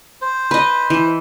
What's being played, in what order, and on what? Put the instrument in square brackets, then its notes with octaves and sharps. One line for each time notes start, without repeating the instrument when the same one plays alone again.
[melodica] C5
[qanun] B4 D#5
E3